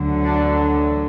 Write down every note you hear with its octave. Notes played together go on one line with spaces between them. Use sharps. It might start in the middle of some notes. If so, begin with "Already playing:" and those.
Already playing: D2 D3 F#3
D4